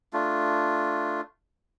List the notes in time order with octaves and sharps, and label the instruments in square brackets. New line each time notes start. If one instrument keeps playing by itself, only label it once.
[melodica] A3 D4 F4